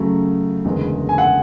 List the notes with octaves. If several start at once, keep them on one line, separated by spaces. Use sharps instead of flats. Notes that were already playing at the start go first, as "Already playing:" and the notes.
Already playing: F#2 C#3 F#3 A3
F#1 E2 D3 G#3
G#5
F#5